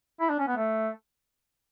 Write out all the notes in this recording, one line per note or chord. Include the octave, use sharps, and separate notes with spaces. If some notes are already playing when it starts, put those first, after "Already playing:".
E4
D4
C#4
B3
A3